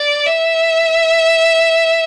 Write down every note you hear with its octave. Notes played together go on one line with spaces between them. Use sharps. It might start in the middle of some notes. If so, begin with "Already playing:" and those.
Already playing: D5
E5